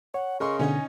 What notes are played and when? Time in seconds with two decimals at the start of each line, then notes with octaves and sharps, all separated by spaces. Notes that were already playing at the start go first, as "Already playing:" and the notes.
0.14 C#5 F#5
0.40 C#3 A#4 D#5 C6 C#6
0.59 B2 D3 C#4 D#4 D#5 G#5